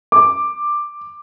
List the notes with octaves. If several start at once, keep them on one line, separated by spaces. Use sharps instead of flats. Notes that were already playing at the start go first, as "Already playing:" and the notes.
D6